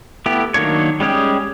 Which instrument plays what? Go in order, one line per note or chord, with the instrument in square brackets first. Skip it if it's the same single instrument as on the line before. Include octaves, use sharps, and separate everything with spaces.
[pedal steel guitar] A3 B3 E4 G4
D#3 F#3 A#3 D4 C#5
G3 G#3 C#4 G4 G#4